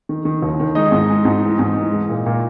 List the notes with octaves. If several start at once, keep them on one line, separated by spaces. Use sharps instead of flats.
D#3
D#3
D#2
D#3
G#3 D#4 D#5
G#2
G#3
G#2
E3
G#2
E3
G#3
A#2
A#2